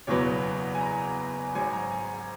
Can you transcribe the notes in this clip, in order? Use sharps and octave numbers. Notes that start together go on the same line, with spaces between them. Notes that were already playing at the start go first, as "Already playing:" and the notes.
F#1 E2 B2 F#3 B3 C#5
G#5
A#5
G#1 G#2 F#3 G#5
A#5
G#5